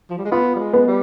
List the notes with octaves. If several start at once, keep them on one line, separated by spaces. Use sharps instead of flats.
F3
G3
G#3
B3 F4
G3
G#3
B3
G3